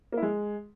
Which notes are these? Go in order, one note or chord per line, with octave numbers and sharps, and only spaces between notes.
A#3
E4
G#3